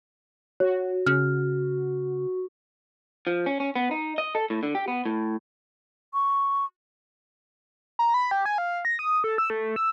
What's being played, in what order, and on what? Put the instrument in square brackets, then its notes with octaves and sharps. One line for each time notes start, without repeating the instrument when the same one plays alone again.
[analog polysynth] F#4 [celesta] C#5
[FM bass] C#3 [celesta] F6
[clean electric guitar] F3
C#4
C#4
B3
D#4
D#5
A4
A2
D3
G4
B3
A2
[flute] C#6
[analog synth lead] A#5
B5
G4
G#5
F5
A#6
D#6
A4
E6
A3
E6